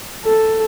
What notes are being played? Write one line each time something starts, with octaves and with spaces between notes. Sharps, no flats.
A4